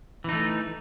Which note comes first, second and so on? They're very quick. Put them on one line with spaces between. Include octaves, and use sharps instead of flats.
E3 D#4 A3